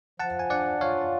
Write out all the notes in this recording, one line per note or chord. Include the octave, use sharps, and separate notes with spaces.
F3 F#5 A5
G#5
D4 D5 F#5
F4 C#5 F5